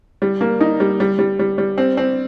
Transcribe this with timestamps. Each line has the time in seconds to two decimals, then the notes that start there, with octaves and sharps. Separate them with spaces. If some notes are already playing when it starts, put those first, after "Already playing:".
0.22 G3
0.41 A#3
0.61 D#4
0.80 G3
1.00 G3
1.19 G3
1.39 G3
1.58 G3
1.78 C4
1.97 C4